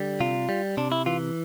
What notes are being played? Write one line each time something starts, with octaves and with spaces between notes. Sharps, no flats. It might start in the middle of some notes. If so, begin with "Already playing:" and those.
Already playing: D3 G3
C3 F4
G3
C3 D4
E4
E3 F4